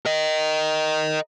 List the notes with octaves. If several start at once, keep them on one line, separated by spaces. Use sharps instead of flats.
A#4 D#5